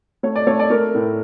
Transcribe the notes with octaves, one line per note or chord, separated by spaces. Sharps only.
A3 C#5
D5
A3 C#5
D5
A3 A#4
A2